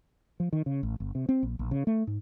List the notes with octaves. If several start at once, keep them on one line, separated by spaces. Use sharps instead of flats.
F3
D#3
C#3
A1
G1
C3
C4
A#1
A#1
C#3
A3
G#2